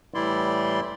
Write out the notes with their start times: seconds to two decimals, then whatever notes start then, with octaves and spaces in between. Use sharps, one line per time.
0.14 A2 E3 G3 E4 D5 C6